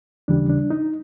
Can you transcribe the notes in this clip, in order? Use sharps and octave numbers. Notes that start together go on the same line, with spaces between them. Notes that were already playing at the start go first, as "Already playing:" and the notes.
D#2 C#3 E3 G3 D4
D4
D#4